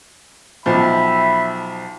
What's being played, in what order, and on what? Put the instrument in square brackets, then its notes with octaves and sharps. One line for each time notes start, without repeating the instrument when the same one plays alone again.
[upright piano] B1 F3 [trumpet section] E5 G5 B5